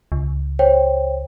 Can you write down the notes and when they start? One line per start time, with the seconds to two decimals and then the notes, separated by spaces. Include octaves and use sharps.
0.12 C#2
0.59 C5 C#5 G5